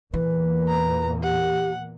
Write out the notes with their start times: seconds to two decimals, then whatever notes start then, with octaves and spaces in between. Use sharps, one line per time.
0.14 E2 A#2 E3 A#3 B4
0.68 A#5
1.23 G4 F#5